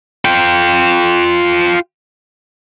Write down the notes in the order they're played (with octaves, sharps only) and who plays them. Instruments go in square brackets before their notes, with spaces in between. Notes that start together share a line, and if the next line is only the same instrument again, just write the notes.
[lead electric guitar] F4 G5